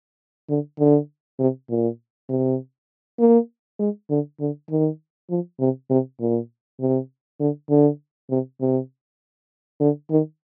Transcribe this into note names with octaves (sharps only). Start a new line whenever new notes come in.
D3
D3
C3
A#2
C3
A#3
G#3
D3
D3
D#3
F3
C3
C3
A#2
C3
D3
D3
C3
C3
D3
D#3